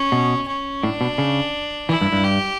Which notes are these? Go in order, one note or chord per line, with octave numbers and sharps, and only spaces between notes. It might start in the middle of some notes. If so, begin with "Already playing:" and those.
Already playing: C#4
B2
C#4
A2 D4
B2
C#3
E3 E4
G2
G2
G4